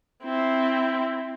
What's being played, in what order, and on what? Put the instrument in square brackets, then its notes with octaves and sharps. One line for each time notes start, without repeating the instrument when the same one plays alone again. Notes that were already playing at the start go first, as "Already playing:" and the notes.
[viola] C4 E4